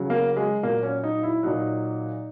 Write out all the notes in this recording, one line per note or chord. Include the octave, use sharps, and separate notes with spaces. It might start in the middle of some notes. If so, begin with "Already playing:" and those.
Already playing: C#3 F#3
A#3
G#3
A#2 F#3 A#3
C#4
D#4
E4
A#2 F#3 D#4